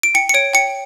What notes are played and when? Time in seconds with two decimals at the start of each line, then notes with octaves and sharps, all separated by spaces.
0.03 D7
0.15 G5 C#7
0.29 C#7
0.34 C#5 D7
0.53 G5 C#7